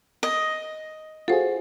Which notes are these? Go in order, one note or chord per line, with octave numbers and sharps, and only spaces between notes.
D#5
F4 F#4 G#4 A4 C5